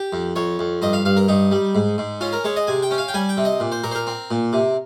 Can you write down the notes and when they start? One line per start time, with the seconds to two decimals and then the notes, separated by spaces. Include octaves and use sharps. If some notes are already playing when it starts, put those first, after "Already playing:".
Already playing: G4
0.13 F2
0.36 F2 C#5
0.59 F2
0.82 G2 D#5
0.93 F5
1.05 G2 F5
1.17 A#4
1.28 G2 D#4
1.52 G3
1.75 G#2
1.98 G#2
2.21 C#4 F4
2.33 A#4
2.44 G#3 C#5
2.56 D#5
2.67 C3 G#5
2.83 G5
2.91 C#4
2.98 F5
3.08 G5
3.14 G3 G#5
3.29 G5
3.37 C3
3.45 D#5
3.60 A#2
3.72 C5
3.84 A#2 A#4
3.91 C5
3.95 A#4
4.07 C4
4.31 A#2
4.53 C3